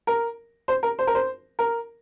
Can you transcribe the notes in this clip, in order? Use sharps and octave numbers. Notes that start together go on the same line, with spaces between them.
A#4
C5
A#4
C5
A#4
C5
A#4